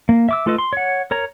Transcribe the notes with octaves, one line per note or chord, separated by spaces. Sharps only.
A#3
E5 D6 E6
A3 F4 A4 B4 D#5
C6
C#5 F#5
A#4 C#5 A#5